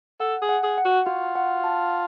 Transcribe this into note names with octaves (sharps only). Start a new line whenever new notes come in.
A4 F#5
G#4
F#5
G#4
F#5
F#4
F4 F#4
F#5
A5